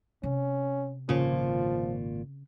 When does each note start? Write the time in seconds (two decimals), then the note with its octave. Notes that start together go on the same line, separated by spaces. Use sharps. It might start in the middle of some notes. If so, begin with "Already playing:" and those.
0.23 C3 C#4
1.09 G#1 A#2 C#3 F3